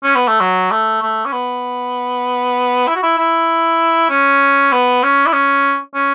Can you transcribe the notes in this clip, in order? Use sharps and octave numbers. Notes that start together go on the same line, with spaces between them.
C#4
B3
A3
F#3
A3
A3
C#4
B3
E4
F#4
E4
E4
C#4
B3
C#4
E4
C#4
C#4